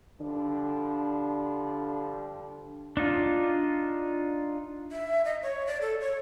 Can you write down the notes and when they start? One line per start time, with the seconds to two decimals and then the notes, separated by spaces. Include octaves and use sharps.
0.21 D3 F3 G3 D4
2.97 D4 D#4 F4
4.92 E5
5.25 D#5
5.43 C#5
5.67 D5
5.81 A4
6.00 C#5